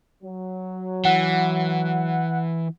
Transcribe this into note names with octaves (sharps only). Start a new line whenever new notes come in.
F#3
E3 F#5